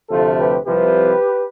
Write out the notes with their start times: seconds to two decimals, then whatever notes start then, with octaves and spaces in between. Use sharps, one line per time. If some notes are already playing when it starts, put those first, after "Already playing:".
0.09 D2 C3 F3 A3 F4 A4
0.38 G4 B4
0.66 C2 C3 F3 G4 B4